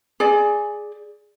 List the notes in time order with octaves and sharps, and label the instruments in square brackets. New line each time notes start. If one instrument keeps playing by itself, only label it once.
[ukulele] G#4 D5 G#5